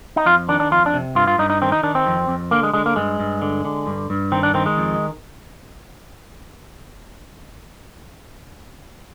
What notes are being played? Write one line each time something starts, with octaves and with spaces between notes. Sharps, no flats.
D#4
F2 F4
D#3 D4
D4
F2 F4
D4
C3
G2 F4
F4
G2 D#4
D#4
D#3 C4
D#4
D#3 D4
C4
F2
F2
D3 A#3
G#3
D3 G#3
A#3
G2 G#3
G2
D3
D3
G2
G2
D#3 C4
D4
D#3 C4
G#3
F2